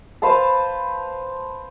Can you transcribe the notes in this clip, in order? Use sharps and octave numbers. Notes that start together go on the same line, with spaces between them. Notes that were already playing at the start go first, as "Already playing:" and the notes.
B4 C5 F5 A5